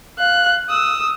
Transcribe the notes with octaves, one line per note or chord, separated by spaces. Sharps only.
F5 F#6
D#6 E6